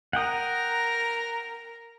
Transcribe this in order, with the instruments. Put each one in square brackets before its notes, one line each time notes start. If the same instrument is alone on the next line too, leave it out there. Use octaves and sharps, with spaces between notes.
[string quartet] A#4 A#5 [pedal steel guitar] F#5 G5 D#6